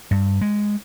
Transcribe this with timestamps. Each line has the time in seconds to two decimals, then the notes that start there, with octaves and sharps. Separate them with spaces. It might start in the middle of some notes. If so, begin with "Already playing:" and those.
0.11 G2
0.41 G#3